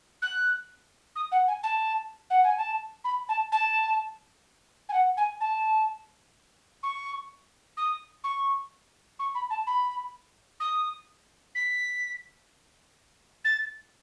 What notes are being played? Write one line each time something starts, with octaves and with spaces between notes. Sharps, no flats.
F#6
D#6
F#5
G#5
A5
F#5
G#5
A5
B5
A5
A5
G#5
F#5
G#5
A5
C#6
D#6
C#6
C#6
B5
A5
B5
D#6
B6
A6